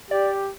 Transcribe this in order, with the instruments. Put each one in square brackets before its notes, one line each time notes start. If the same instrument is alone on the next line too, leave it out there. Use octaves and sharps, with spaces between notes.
[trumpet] G4 [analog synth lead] D5